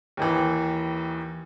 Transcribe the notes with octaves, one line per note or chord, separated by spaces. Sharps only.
D#2 D#3 E3